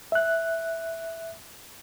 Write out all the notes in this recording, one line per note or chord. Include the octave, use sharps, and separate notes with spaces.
E5 F#6